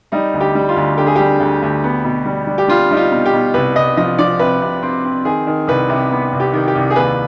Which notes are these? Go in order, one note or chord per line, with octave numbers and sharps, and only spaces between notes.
G3 D#4
D2
G4
G3
F4
D2
D3 G4
G#4
G3 G4
D2
D2
B3
B2
G3
G3
G4
G3 F4
G3 D#4
F4
B2
G4
B2
C2 B4
C2 D#5
F3 D#5
F3 D5
C3 B4
C3
C4
C4
D#3 G#4
D#3
C2 B4
C3
B3
C2
G4
D#3
G4
C2
G#4
D#2 B4